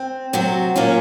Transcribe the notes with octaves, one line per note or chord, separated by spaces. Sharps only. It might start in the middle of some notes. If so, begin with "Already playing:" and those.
Already playing: C4
C3 F#3 C4 F#4
A#2 F#3 A#3 C#4 F4